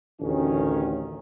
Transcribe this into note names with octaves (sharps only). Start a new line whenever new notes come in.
A1 D2 D#3 C#4